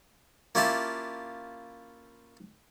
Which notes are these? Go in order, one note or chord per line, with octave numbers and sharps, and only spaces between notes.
A#3 C#4 E4 F4 G4 A5